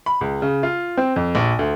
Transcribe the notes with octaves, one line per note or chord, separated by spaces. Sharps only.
B5
C#2
C#3
F4
C4
F2
A#1
D2